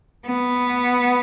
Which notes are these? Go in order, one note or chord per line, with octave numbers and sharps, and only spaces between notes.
B3